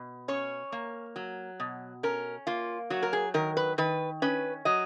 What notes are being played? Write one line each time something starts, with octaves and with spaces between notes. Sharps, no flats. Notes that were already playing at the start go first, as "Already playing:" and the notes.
Already playing: B2
C#4 C#5
A#3
F#3
B2
C#4 A#4
A#3 F4
F#3 F#4
A#4
G#4
D#3 A#4
B4
D#3 B4
C#4 B4
F#3 D#5